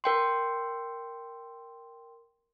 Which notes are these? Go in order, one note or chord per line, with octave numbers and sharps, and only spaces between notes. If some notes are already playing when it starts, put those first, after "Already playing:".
A#4 G5 C6